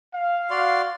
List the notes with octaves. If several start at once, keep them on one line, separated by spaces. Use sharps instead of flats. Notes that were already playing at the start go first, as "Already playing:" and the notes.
F5
F#4 D5 C6